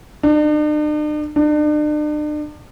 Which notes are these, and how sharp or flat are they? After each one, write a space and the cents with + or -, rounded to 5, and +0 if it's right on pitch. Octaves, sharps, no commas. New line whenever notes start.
D4 +45
D4 +40